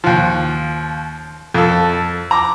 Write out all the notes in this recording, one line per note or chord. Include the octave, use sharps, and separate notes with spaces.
D#2 F3
F2 A4
A#5 D6